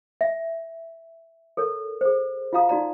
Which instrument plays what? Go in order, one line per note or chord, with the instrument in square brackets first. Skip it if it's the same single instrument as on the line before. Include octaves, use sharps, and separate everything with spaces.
[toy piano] E5
A4 A#4 C#5
G#4 C5
F4 F#4 F5 A#5 D#6
D#4 F#4 D5 A#5